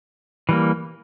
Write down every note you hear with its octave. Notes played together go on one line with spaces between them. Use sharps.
E3 G3 A#3